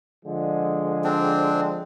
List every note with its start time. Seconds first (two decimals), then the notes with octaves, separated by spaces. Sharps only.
0.25 D3 F3 G#3
1.04 C4 D4